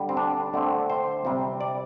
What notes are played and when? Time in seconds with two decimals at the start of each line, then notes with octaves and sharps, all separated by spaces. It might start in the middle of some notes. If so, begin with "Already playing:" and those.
Already playing: D3 G3
0.09 C4
0.17 D4
0.54 D3 A3 C4
0.90 C5
1.25 C3 G3 C4
1.61 D5